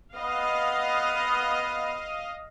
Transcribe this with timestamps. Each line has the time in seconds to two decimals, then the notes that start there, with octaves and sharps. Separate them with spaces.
0.16 B3 D#5 F5